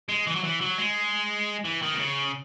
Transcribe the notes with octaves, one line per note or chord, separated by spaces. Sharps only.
G#3
E3
F#3
E3
F#3
G#3
E3
D#3
B2
C#3